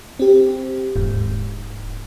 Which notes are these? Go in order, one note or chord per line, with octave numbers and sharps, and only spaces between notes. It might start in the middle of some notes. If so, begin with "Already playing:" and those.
C4 G4
D#1 G#2